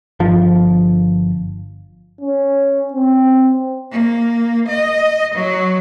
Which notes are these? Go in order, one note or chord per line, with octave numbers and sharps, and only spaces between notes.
G1 F3
C#4
C4
A#3
D#5
F#3